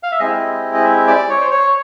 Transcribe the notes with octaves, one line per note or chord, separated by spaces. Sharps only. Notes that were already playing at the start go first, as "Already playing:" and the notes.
F5
E5
G#3 C4 E4 G4 D#5
D#5
E5
D5
C#5
C5
C#5